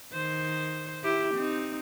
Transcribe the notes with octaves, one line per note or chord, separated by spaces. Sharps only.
D#3 C5
E4 G4
C4 D#4